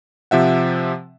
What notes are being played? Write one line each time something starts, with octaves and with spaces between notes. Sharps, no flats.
C3 F3 E5 F#5